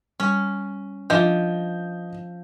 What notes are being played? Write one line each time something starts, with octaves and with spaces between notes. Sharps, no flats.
G3 C#4
F3 D4 F4 D#5 G6